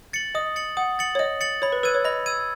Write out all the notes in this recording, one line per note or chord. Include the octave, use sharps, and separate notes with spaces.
A6 C#7 F#7
D#5 D#6
A6 C#7 F#7
F#5 D#6
A6 C#7 F#7
C#5
D#5 D#6
A6 C#7 F#7
C#5 B5
B4
B4 E6 G#6 D#7
C#5
D#5 B5
E6 G#6 D#7